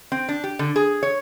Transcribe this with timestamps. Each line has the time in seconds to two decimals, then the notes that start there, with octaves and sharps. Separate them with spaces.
0.12 C4
0.29 D4
0.44 G4
0.59 D3
0.76 G#4
1.03 C#5